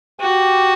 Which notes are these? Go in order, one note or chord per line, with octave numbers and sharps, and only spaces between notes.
F#4 G4